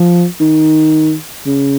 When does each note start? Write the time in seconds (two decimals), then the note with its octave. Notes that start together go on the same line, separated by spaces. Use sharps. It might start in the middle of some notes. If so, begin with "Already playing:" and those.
Already playing: F3
0.40 D#3
1.46 C#3